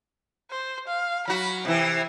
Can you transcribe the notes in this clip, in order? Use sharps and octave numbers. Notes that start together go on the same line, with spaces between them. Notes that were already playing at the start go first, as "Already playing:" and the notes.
C5
F5
F#3 F#4 B5
C3 E3 E4